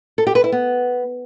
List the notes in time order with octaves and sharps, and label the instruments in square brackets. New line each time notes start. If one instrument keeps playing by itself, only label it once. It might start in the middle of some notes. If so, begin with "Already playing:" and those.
[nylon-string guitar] A4
G4
B4
E4
B3